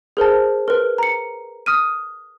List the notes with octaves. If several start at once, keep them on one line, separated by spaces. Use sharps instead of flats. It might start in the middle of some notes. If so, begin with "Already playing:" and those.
G#4 A#4 C5 A5
A#4 B4
A#5 C#7
D#6 F6 D#7